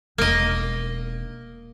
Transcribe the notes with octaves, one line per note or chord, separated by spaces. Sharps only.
E1 A#3 D#4 D#5